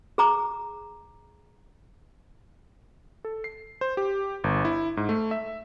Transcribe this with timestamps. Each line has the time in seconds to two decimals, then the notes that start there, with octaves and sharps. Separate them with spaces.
0.18 G#4 A#5 D6
3.25 A4
3.44 C7
3.81 C5
3.97 G4
4.44 G1
4.65 E4
4.97 G#2
5.09 A3
5.31 E5